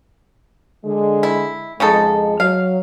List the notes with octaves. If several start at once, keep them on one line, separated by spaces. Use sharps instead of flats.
D3 G#3
E4
F2 C#3 G#3 D#4 A4
F#3 F5